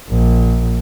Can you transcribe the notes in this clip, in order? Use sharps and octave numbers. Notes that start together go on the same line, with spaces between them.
A#1